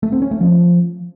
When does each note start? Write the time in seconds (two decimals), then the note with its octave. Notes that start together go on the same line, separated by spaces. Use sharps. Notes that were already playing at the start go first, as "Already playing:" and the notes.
0.03 A3
0.12 C4
0.22 C#4
0.31 A3
0.41 F3